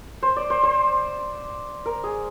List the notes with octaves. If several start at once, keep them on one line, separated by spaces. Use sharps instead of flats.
C5
D5
C5
C5
A#4
G#4